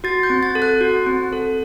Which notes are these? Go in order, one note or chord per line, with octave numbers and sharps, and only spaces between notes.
F#4 A6
G6
C4
A6
A4
F#6
F#4
C4
A4